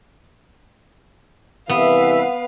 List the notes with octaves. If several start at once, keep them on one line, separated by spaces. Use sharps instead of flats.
C2 E3 B3 B4 E5 F5